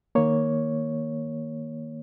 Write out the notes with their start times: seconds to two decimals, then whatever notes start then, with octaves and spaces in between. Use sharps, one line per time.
0.15 D#3 A#3 C#5